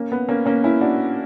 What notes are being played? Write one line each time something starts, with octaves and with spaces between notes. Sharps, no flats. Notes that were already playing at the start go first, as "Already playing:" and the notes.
Already playing: A#3 C#4
B3
A#3 C#4
A#3 C#4
C#4 E4
D4 F#4